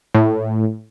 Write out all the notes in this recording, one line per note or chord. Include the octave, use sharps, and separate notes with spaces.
A2